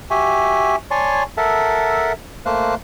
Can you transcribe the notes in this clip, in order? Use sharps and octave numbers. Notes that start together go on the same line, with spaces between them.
F#4 G4 E5 G#5
C#5 D5 G#5 A5 C6 C#6
A4 A#4 E5 F#5 A5
A3 A#3 C5 F5 F#6